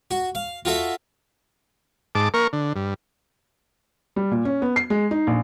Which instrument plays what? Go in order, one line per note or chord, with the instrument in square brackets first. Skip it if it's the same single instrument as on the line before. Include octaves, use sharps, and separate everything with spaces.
[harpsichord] F#4
F5
F4 F#4 A4 E5
[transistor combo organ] G#2 A5 D6
A#3 A#4 C#6
D3
G2
[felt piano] G3
A#2
C#4
B3
C7
G#3
D#4
A#1